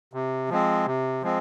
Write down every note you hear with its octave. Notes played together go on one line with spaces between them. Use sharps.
C3
F3 G#3 C4
C3
F3 G#3 C4